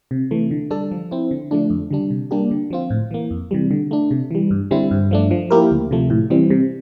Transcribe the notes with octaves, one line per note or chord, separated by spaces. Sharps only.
C3
E3 A3
D3
G3 D4 A4
F3
C4 E4
D3
F3 A3 D4
F2
D3 G3 D4
C3
G3 A#3 D4 G4
D3
F3 C4 F4
A2
E3 A#3
F2
C3 E3 G3
D3
A3 D4
C3
E3 G3
G2
D3 G3 C4 E4
G2
F3 A3 D4
F3
A#3 E4 G4 A#4
D2
C3 F3 A3
A2
E3 G3 C4
C3